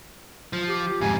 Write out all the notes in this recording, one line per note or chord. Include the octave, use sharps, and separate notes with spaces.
F3
G4
F2 G#2 G#5